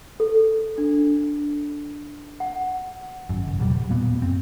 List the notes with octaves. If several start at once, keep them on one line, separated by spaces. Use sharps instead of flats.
A4
D4
F#5
G#1 F#2
F#1
E2 B2 F#3 G3
A#2 A#3 B3
F#2 C4